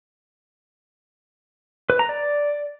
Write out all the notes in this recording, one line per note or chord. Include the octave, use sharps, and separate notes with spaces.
B4
A#5
D5